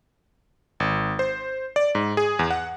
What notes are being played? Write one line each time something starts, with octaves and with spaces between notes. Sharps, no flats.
G#1
C5
D5
G#2
G#4
E2
F#5